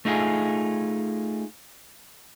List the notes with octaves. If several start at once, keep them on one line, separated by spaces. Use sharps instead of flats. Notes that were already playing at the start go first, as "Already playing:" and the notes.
A3 D#4 F4 G#4